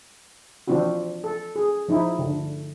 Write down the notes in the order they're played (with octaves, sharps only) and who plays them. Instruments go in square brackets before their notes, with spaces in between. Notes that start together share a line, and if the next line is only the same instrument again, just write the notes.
[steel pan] E3 F3 C4 D4 F4 F#4
A4
G#4
F3 D#4 E4
D3